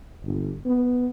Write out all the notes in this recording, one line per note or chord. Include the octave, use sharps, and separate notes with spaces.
G1
B3